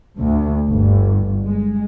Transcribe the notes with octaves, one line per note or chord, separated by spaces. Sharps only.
D2
G1
G#3